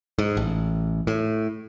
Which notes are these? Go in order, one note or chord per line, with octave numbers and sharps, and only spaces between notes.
G#2
A1
A2